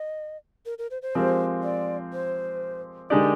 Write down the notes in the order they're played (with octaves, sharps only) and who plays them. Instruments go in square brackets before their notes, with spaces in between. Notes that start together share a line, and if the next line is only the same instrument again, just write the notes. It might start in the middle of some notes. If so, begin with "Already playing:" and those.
Already playing: [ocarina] D#5
A#4
A#4
C5
C5
[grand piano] F3 G#3 C4 G4 A#4
[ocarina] D5
C5
[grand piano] D3 G#3 D#4 G4 D5 [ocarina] A#4